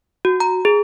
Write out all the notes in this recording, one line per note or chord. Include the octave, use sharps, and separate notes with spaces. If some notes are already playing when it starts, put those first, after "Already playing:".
F#4
A#5
G#4